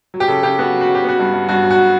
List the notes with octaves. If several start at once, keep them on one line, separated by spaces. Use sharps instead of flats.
F#3
G4
C#3 A4
C#3 G4
B3 F#4
F#3
F#4
C#3
G4
B3 F#4
G2
G2
G2 F#4
F#3
F#4